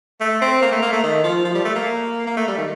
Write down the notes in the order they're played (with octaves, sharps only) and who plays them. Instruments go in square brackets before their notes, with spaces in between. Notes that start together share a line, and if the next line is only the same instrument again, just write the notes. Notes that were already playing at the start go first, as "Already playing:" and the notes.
[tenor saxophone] A3
C4
A#3
A3
A#3
A3
D#3
F3
F3
G3
A3
A#3
A#3
A3
G3
D#3